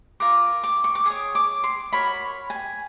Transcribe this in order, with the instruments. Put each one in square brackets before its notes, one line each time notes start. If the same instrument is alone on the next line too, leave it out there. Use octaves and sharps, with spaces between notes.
[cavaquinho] F4 A#4 D6
D6
C#6
D6
G#4 C#5 D#6
D6
C6
F#4 A#4 C#5 B5
G#5